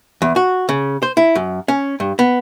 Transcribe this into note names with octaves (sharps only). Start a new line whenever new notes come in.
E2
F#4
C#3
C5
E4
F#2
C#4
G2
B3